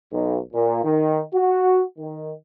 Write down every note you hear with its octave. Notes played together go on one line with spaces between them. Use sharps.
B1
A#2
D#3
F#4
D#3